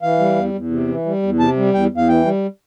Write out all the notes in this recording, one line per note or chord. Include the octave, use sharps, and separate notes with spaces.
E3 F5
G3
E2
E2
C3
E3
G3
E2
C3 A5
G3
E2 G5
E2
F5
E3 G5
G3